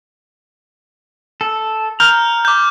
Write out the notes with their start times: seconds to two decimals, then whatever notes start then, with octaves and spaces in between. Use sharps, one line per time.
1.41 A4
2.00 A#5 F6 G6
2.45 D6 G6